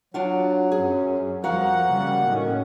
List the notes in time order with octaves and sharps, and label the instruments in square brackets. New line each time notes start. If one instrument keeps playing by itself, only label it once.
[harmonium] F#3 [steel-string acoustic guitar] D4 F4 F#4
[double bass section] F#2 C#4 [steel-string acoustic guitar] G#4
[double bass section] F2 F3 G3 [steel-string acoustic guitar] F#4 A#4 F5 [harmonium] F#5
[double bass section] C#3 G3 A#3
A2 D#3 C#4